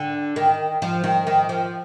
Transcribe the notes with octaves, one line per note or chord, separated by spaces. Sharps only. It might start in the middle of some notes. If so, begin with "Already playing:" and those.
Already playing: D3
D#3
F3
D#3
D#3
F3